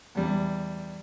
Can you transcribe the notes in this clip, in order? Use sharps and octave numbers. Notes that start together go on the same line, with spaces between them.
E2 G3